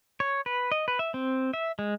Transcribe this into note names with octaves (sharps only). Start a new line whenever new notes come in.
C#5
B4
D#5
B4
E5
C4
E5
G#3